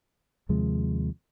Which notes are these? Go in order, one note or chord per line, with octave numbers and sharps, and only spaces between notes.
D#2 C3 F3 G#3